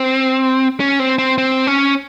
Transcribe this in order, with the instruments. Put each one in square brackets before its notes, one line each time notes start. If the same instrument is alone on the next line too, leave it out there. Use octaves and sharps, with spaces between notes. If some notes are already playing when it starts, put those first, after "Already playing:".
Already playing: [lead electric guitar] C4
C#4
C4
C4
C4
C#4